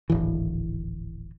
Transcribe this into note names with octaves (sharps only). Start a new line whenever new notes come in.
D1 G#1 E3